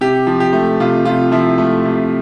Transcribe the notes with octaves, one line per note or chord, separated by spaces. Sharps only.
C3 G4
F3
G4
A3
C3 F4
C3 F4
F3 E4
A3
C3